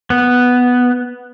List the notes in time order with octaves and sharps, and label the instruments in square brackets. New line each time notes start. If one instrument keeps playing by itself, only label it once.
[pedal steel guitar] B3